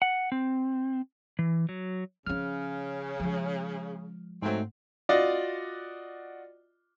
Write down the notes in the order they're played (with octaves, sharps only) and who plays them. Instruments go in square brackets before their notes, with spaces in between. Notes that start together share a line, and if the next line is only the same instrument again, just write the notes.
[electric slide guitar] F#5
C4
E3
F#3
[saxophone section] C#3 [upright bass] F3 C#4 [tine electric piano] F6
[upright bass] F3 G#3
[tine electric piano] G#2 A3 [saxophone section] F#3 C4
[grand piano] F4 F#4 D5 D#5